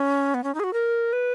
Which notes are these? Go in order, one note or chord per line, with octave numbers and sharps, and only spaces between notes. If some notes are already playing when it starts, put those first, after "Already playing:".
Already playing: C#4
B3
C#4
D#4
G#4
F#4
A#4
B4